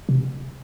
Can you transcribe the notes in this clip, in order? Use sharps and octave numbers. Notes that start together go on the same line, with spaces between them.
C3